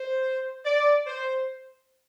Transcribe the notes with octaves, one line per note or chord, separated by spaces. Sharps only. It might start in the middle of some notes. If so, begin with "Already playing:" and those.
Already playing: C5
D5
C5